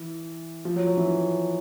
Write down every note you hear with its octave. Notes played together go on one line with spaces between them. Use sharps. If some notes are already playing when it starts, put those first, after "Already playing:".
Already playing: E3
F3
F#3
F#3
E3